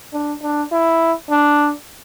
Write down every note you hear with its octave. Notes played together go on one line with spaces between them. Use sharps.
D4
D4
E4
D4